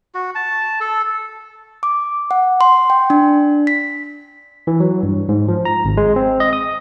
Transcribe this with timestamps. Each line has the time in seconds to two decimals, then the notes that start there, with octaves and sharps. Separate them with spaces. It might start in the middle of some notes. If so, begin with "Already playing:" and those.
0.15 F#4
0.35 A5
0.81 A4
1.83 D6
2.31 F#5
2.61 C6
2.90 G5
3.10 D4
3.67 B6
4.67 E3
4.80 F#3
5.03 G2
5.29 G#2
5.48 F3
5.65 A#5
5.85 G#1
5.97 G#3
6.16 C4
6.40 D#5
6.53 D#6